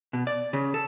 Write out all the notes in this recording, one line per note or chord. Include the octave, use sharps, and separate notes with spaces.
B2
D5
C#3
A4